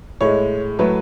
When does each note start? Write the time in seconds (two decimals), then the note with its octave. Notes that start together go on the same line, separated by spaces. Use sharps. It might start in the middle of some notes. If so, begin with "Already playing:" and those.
0.21 A2 G#3 C#5
0.79 A2 F#3 A3 B4